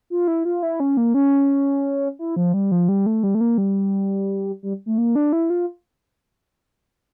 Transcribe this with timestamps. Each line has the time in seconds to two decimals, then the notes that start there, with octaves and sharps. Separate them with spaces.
0.10 F4
0.28 E4
0.45 F4
0.63 E4
0.80 C#4
0.97 A#3
1.14 C#4
2.19 E4
2.36 F3
2.54 G3
2.72 F3
2.89 G3
3.06 A3
3.23 G3
3.35 A3
3.41 A#3
3.58 G3
4.63 G3
4.86 A3
4.98 A#3
5.15 D4
5.33 E4
5.50 F4